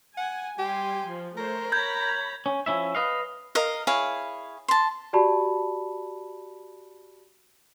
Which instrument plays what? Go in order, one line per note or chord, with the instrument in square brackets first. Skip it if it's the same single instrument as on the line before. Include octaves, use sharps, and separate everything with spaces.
[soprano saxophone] F#5 [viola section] G#5
[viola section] G3 G#5 C6 [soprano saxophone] G4
[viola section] F3
[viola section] A3 C5 C#5 [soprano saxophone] A#4
[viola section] C#5 A#5 B5 [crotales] G6 G#6
[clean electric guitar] C#4
F3 C#4 E4 E5
B4 D#5 F5
[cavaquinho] A#4 D#5 F5
E4 G#4 C#5 F5
A5 C6
[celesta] F#4 G4 D5 A5 B5